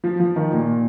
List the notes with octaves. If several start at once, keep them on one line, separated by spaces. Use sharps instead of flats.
F3
F3
D#3
A#2